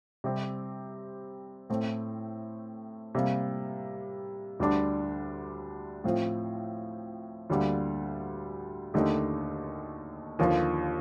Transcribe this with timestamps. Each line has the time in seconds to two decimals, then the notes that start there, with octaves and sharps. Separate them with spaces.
0.24 C3 G3 C4 G4
1.70 A2 A3 C4
3.15 C3 G3 A#3
4.60 D2 D3 G3 D4
6.04 A2 F3 C4 F4
7.50 D2 D3 G3 A#3
8.94 D#2 D3 A3 D#4 G4
10.39 D#2 D3 F3